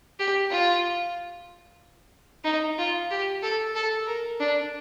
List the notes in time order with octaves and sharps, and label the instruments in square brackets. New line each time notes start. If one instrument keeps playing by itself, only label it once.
[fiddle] G4
F4
D#4
F4
G4
A4
A4
A#4
D4